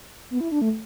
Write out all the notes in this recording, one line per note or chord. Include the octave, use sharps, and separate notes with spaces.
B3
E4
D4
A3